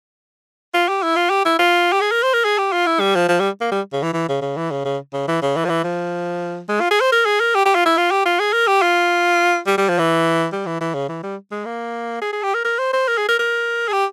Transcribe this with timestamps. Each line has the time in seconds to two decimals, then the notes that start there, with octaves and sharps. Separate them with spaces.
0.74 F4
0.88 G4
1.03 E4
1.16 F4
1.30 G4
1.45 E4
1.59 F4
1.93 G4
2.01 G#4
2.11 A#4
2.23 C5
2.34 A#4
2.44 G#4
2.58 G4
2.73 F4
2.86 E4
3.00 G3
3.15 F3
3.29 F3
3.40 G3
3.61 A#3
3.71 G3
3.93 C#3
4.03 E3
4.13 E3
4.29 C#3
4.42 C#3
4.57 E3
4.71 C#3
4.85 C#3
5.13 C#3
5.28 E3
5.42 C#3
5.56 E3
5.65 F3
5.69 E3
5.84 F3
6.69 G#3
6.80 F4
6.91 G#4
7.01 C5
7.12 A#4
7.25 G#4
7.40 A#4
7.55 G4
7.65 G4
7.75 F4
7.85 E4
7.97 F4
8.11 G4
8.25 F4
8.39 G#4
8.53 A#4
8.67 G4
8.82 F4
9.67 G3
9.78 G3
9.89 F3
9.99 E3
10.52 G3
10.66 E3
10.81 E3
10.94 C#3
11.09 E3
11.23 G3
11.51 G#3
11.65 A#3
12.21 G#4
12.33 G#4
12.43 G4
12.54 A#4
12.65 A#4
12.78 C5
12.93 C5
13.08 A#4
13.17 G#4
13.28 A#4
13.39 A#4
13.88 G#4
13.92 G4